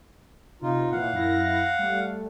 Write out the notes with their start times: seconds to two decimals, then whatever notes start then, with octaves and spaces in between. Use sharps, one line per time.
0.62 C3 D#4 F4
0.91 A#2 E3 F5 F#5
1.13 F#2 E4 A#6
1.79 G3 A3